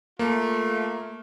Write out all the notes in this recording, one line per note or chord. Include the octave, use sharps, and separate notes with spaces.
A3 A#3 F4